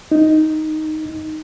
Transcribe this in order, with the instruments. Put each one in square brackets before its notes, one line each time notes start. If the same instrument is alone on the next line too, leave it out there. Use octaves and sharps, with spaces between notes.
[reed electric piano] D#4